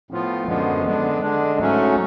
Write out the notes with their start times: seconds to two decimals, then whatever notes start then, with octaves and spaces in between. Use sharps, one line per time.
0.11 A2 F3 B3 F4
0.48 F#2 D3 F3 G#3 B3
0.85 D3 G#3 B3 D4
1.22 D3 G#3 D4
1.59 G#2 F#3 A3 C#4